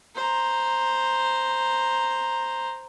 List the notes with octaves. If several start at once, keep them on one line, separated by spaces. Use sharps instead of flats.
C5 A#5